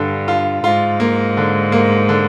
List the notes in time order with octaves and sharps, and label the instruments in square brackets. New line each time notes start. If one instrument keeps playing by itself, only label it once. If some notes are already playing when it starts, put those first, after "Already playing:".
Already playing: [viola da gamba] G2 [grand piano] D3
[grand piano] F4
[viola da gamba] G#2 [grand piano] F4
[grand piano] A#3
D3
A#3
D3